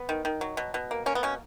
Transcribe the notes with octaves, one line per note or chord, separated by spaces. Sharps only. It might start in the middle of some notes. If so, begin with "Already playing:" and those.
Already playing: B3
D#3
D#3
F#3
B2
B2
A#3
A#3 C#4
B3
B2 C#4